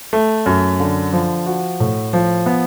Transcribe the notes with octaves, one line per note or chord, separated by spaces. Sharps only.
A3
F#2
D3
F3
F#4
A2
F3
B3